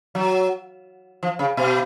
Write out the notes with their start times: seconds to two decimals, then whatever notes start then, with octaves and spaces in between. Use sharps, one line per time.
0.15 F#3
1.23 F3
1.39 C#3
1.57 B2